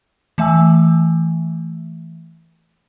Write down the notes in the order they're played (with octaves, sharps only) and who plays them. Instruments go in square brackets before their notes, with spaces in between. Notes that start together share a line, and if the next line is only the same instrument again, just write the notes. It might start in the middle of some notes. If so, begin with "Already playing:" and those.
[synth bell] E3 A3 E5 G#5 E6